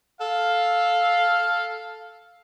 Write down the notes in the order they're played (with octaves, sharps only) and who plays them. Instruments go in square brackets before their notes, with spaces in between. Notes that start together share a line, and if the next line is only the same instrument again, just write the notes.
[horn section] A4 F5